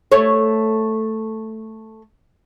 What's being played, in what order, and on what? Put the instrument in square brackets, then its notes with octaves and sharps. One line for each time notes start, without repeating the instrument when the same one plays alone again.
[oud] A3 C#5